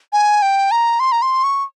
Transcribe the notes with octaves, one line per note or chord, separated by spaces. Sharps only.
G#5
G5
A#5
C6
A#5
C6
C#6